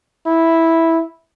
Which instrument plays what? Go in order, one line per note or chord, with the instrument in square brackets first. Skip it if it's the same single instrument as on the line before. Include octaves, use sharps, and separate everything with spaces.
[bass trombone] E4